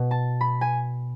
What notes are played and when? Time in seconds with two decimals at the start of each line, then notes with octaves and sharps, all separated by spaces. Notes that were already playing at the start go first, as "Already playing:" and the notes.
Already playing: B2
0.11 A5
0.41 B5
0.61 G#5